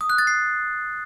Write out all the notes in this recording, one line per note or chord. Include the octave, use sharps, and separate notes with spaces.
D#6
F#6
A6
C7